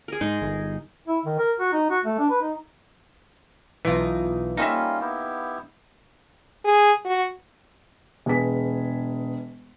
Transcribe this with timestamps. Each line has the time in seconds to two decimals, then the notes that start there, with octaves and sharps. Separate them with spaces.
0.08 G#4 A#4
0.21 G#2 D#4
0.42 G1
1.08 E4
1.25 D#3
1.39 A#4
1.60 F#4
1.73 D#4
1.90 F#4
2.04 A3
2.19 D4
2.30 B4
2.41 D#4
3.85 B1 E3 D#4 F4
4.57 G3 A#3 C#4 D#4 F4 D#5 E5
5.01 B3 E4 G4
6.65 G#4
7.05 F#4
8.26 E1 G#4 B4 B6